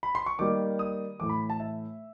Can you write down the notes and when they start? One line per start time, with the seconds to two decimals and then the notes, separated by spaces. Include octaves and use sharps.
0.03 B5
0.15 C6
0.26 C#6
0.39 D#3 G3 A#3 D6
0.79 D#6
1.19 A2 E3 A3 D6
1.29 B5
1.50 A5
1.60 E5